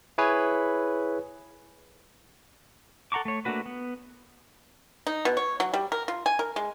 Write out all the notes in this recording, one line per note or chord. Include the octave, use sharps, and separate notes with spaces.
E4 G#4 B4 C#5 G#5
A4 F#5 A#5 C#6 D6
A3 C#5
A3 A#3 D4 F#4 B4
B3
D#4
B2
C#5
F#3
G3
A#4
F4
G#5
A#4
G#3